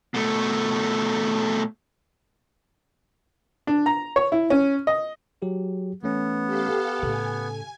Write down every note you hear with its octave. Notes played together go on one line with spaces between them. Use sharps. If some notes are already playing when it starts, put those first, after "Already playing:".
B2 A3
D4
A#5
C#5
E4
C#4
D#5
F#3 G4 G#4
E3 A3 B3 C#4
G4 A4 F5
A2 C#3 A4 G#5